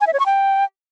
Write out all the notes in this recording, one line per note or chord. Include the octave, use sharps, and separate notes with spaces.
G#5
E5
C#5
C#6
G5